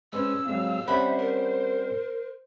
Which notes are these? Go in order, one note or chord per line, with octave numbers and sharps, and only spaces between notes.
G#3 C#4 B4 C5 E6
F#3 G#3 C4 F5
G3 C4 C#4 C5 E5 F#5 B5
A#4